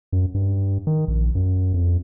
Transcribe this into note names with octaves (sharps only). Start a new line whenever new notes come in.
F#2
G2
D#3
A#1
F#2
F2